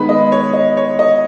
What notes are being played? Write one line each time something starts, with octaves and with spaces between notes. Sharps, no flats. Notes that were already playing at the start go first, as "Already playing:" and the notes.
Already playing: D#3 G#3 B3 B5
D#5
C#5
D#5
C#5
D#5